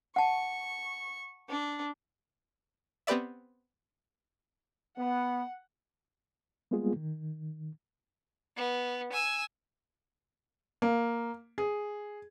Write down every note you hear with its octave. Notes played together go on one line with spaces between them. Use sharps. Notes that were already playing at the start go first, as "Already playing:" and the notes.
F#5 A5 C#6
D4
B3 C4 G4 B4 D5 E5
B3 F#5
G3 G#3 A#3 B3 F4 G#4
D#3
B3
G#5 E6
A#3
G#4